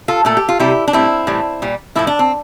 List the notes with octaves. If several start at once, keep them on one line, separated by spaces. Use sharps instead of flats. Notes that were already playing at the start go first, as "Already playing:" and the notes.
F4 A4
A#2 A3 A4
G4
F4
C3 G3 E4 G4
D4
A2 G3 C4 E4
A2 E3 G3
A#2 G3
A2 F3 A3 E4
D4
C4